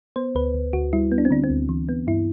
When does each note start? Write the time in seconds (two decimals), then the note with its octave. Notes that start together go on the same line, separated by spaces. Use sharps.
0.16 B3 C5
0.35 D2 B4
0.54 D2
0.73 D2 F#4
0.93 G3 E4
1.12 B3
1.18 D4
1.25 C4
1.31 D3 D4
1.44 C4
1.50 D2
1.69 E3
1.89 B3
2.07 G2 E4